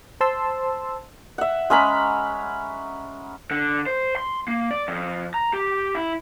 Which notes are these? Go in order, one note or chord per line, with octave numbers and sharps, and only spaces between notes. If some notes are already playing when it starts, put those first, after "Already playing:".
C5 A5 C6 E6
E5 F#5
G#3 C#4 A#5 B5
D3
C5
C6
A#3
D5
F2
A#5
G4
E4